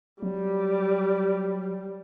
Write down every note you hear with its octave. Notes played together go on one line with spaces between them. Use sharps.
F#3 G3